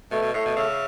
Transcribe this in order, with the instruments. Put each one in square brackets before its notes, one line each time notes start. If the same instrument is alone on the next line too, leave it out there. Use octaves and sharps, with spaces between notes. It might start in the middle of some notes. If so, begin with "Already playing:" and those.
[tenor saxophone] B2 [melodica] A3
[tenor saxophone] B2
[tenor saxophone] A2 [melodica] A3
[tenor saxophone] B2
[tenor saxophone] C#3 [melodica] E5